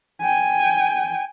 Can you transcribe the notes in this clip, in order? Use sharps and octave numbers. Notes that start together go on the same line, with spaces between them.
G5 G#5